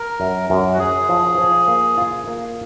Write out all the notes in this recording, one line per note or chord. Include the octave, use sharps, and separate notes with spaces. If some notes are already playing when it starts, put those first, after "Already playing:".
Already playing: A#4
F#2
F#2
F#4
C#4 G#4
F3
F3
A#3
F4
A#3